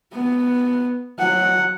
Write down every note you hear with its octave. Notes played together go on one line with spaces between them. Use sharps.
B3
F#3 F#5